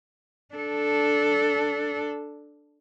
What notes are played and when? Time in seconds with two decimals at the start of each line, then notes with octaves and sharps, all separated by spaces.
0.55 D4 A4